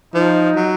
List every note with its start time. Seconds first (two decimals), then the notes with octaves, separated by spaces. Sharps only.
0.14 F3 D#4
0.55 F#3